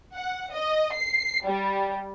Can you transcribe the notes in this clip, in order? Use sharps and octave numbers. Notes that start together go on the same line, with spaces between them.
F#5
D#5
C7
G3